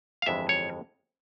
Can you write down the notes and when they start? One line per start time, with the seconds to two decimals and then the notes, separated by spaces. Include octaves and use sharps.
0.22 F5
0.26 G1 F2 E3 G#3 E5
0.49 C#5